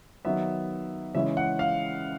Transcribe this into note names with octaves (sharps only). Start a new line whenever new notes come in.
D#3 F#3 B3 E5
C#3 E3 G#3 C#4 E5
F#5
F5